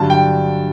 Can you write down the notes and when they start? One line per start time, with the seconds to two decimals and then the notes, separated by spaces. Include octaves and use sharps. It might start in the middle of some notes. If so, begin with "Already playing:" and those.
Already playing: G2 D3 F#3 A5
0.10 G5